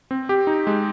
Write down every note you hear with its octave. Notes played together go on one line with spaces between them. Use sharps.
C4
G4
D#4
G#3